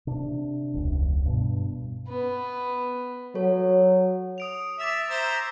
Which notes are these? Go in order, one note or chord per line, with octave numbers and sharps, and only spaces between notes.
C3 D4
E1 C#2
G2 B2
B3
F#3 A4 C#5
D#6 D7 F7
E5 D6 A6 F7
C5 E5 A#5